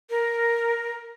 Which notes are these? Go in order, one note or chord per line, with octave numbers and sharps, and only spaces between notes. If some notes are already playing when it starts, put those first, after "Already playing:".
A#4